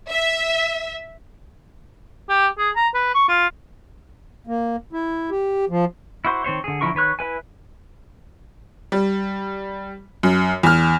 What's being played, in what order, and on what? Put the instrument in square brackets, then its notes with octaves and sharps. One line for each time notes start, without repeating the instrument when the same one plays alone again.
[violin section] E5
[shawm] G4
G#4
A#5
B4
C#6
F4
[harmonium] A#3
E4
G4
F3
[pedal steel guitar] E4 F#4 C5
D#3 C4 C5 C#5
D3 G#4
D3 F3 E4 A#4 C#6
D#3 B4 C#5 F#6
E4 B4 G#5
[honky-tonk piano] G3
F#2
E2 F6